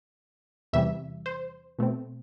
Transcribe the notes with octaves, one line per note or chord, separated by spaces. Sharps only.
E2 C3 E3 G3 E5
C5
B2 A3 C4